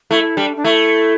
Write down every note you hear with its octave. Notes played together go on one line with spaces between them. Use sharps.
A3 E4
G3 D4
D4
A3 E4